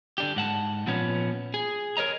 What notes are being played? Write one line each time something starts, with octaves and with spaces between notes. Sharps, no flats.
D3 D4 G4
G#2 F#5 A5
A#2 F3 B3 C#4
G#4
A#4 C#5 D#5 A#5